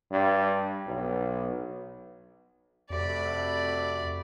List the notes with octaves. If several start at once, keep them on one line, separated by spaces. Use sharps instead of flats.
G2
B1
F2 C3 A3 F#4 D5 B5